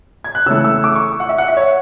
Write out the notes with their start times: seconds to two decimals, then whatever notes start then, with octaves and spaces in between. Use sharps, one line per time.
0.24 G#6
0.35 F#6
0.46 C#3 E3 A3 E6
0.64 E6
0.84 D6
0.95 C#6
1.20 F#5
1.29 E5
1.38 F#5
1.48 E5
1.57 C#5